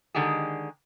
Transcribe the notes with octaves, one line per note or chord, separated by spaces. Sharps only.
D3 D#3 G#3 G4 G#4